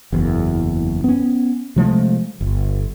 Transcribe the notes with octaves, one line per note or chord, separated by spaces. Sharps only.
F#1 E2
B3 C#4
C3 F3 G#3 A3
G1